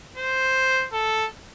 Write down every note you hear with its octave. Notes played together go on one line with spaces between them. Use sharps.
C5
A4